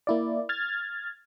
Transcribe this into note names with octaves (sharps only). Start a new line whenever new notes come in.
A#3 E4 D5
F6 G#6 A6